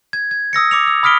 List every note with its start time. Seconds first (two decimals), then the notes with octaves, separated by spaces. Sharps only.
0.13 G#6
0.31 G#6
0.53 D#6 E6 A#6 C#7
0.71 D6 C#7 F7
0.87 E6
1.03 B5 D#6 F6 B6 D7 G7